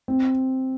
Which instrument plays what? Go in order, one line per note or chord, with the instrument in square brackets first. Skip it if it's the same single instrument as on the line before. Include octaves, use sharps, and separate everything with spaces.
[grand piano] C4